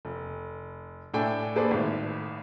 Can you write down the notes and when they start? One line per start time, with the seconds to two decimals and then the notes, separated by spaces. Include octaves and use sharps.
0.05 F1
1.14 A2 D4 A4 G5 G#5
1.55 A#3 G#4 A4 B4 C5 D5
1.71 G#1 A2